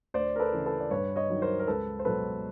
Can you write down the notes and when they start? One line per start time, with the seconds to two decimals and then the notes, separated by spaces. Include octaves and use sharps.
0.14 D2 C5 D5
0.36 A#4
0.39 A4 B4
0.52 C#3 E3
0.66 A4 B4
0.80 D5
0.91 G2 B4 C#5
1.16 C#5 D#5
1.30 D#3 F#3
1.42 A#4 C5
1.59 A#4
1.67 C#2 A4 B4
1.99 C5
2.05 B2 F#3 A4 B4